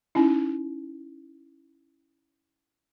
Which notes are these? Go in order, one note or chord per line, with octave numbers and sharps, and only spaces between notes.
C#4 D#4 E4